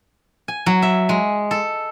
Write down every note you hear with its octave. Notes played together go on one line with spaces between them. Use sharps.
G#5
F#3
E5
G#3
A4